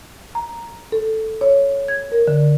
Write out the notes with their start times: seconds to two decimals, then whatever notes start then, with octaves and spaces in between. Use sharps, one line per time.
0.35 A#5
0.92 A4
1.41 C#5
1.88 G#6
2.12 A#4
2.28 D3